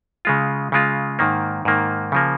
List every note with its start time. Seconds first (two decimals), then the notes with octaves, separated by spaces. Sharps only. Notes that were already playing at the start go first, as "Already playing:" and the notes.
0.25 C#3 G#3 F4
0.72 C#3 G#3 F4
1.19 G#2 D#3 A#3
1.65 G#2 D#3 A#3
2.12 C#3 F3 A#3